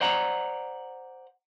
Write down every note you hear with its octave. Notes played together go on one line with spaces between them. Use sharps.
C5 D5 F#5 A#5